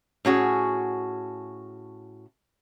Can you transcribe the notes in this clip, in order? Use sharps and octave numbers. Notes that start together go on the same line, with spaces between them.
A2 C#4 F#4 G#4